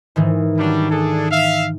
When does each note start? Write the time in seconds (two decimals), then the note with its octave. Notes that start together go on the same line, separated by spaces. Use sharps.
0.16 G#2 D#3 E3
0.58 F#3 G3 D4
0.90 D4 G#4 A4
1.30 E5 F5